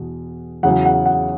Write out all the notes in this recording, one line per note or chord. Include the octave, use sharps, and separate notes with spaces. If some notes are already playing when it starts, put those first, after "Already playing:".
Already playing: E2 B2
E2 C#3 F#3 F#5
F#5
F#5